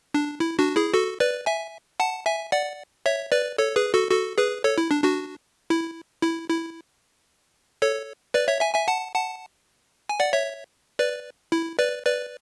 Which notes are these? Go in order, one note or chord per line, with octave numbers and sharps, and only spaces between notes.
D4
E4
D4 F#4
E4 G#4
F#4 A4
B4 D5
E5 G#5
F#5 A5
E5 G#5
D5 F#5
C#5 E5
B4 D5
A4 C#5
G#4 B4
F#4 A4
F#4 A4
G#4 B4
A4 C#5
E4
D4
D4 F#4
E4
E4
E4
A4 C#5
B4 D5
C#5 E5
E5 G#5
E5 G#5
F#5 A5
F#5 A5
G#5
D5 F#5
C#5 E5
B4 D5
E4
B4 D5
B4 D5